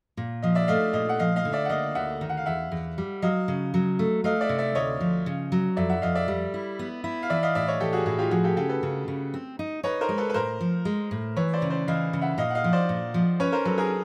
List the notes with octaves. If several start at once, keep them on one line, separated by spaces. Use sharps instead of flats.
A#2
F3 D#5 F5
D5 E5
A3 D#5 F5
A#2 D#5 F5
F#5
F3 D#5 F5
D#5 F5
D3
D5 E5
F#5
A#3 D#5 F5
D2 E5 F#5
D#3
F#5
F5
E2 E5 F#5
E2
G3
F#3 D#5 F5
C#3
F#3
A3
A3 D#5 F5
D5 E5
C3
D5 E5
D2 C#5 D#5
F3
C#3
F#3
F2 D5 E5
E5 F#5
F2 D#5 F5
D5 E5
G3
E4
B3
E4
F5
E3 D5 E5
D#5 F5
A2 D5 E5
C#5 D#5
E3 G4 A4
F#4 G#4
A2 F#4 G#4
F4 G4
F3 F#4 G#4
G4 A4
C#3 G4 A4
A4 B4
C#3
C#3
C4
D#4
D#4 B4 C#5
A#4 C5
G#3
A4 B4
B4
A2 A#4 C5
F3
G#3
A2
E3 B4 C#5
C5 D5
C#3
C5 D5
E3 D#5 F5
C#3
E5 F#5
A#2 D#5 F5
F#5
D#5 F5
F3
C5 D5
A#2
F3
C#4 B4 C#5
A#4 C5
F#3 A4 B4
G#4 A#4